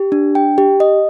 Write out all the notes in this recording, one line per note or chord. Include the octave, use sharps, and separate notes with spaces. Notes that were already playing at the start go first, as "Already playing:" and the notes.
Already playing: G4
D4
G5
G4
D#5